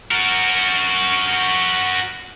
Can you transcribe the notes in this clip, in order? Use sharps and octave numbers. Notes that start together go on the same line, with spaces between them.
F#4 A#4